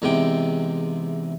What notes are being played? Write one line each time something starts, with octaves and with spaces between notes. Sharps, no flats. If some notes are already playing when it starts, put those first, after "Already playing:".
E2 G#2 C3 G5